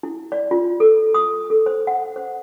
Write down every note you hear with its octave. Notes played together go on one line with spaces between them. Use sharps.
E4
D5
F4
A4
D#6
A4
C5
F#5
C5